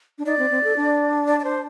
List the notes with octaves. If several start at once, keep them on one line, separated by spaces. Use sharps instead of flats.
D4
D#4 D5
C4
C4
A4
D4
D5
D5
C5